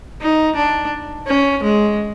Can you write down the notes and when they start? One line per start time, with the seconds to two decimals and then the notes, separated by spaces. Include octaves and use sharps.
0.21 D#4
0.56 D4
1.27 C#4
1.63 G#3